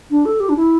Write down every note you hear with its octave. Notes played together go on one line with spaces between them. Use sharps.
D4
A4
G4
D4
E4